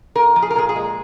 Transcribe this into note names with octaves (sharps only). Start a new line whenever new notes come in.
A#2 A#4
F3
G#4
A#4
A#2 G#4
G#4
G#3